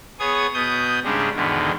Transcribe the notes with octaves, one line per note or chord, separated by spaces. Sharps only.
B3 G#4 C#5 D#6 G#6
B2 B3 D#6 G6
G#2 C#3 G3 G#3 D4
E2 G#2 B2 D3 D#3